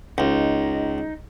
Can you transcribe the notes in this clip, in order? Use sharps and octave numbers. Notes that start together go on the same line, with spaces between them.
C#2 D#4